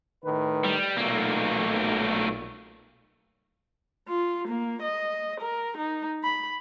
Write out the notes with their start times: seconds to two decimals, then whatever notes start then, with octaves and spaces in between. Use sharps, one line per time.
0.23 A2 D#3 B4
0.65 G3
0.97 B1 A#2 A3 A#3
4.08 F4
4.48 A#3
4.82 D#5
5.40 A#4
5.77 D#4
6.24 B5